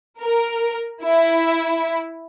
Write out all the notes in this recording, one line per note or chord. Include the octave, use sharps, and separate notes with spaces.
A#4
E4